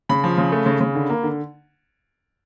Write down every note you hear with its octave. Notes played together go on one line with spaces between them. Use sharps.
C#3 B5
F3
C#3
A3
C#3
C#3
D3
A#3
D3